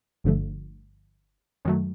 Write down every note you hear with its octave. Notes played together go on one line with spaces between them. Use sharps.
G1 G2 D3 F3 A3
F#2 D#3 F#3 A3